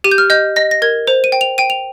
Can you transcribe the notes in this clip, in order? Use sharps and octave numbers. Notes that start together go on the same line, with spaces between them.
G4 D#7
G6
F6
D#5 G6
D#5 A#6
A#6
A#4 G#6
C5 F7
D#7
G5
F7
G5 D#7
F7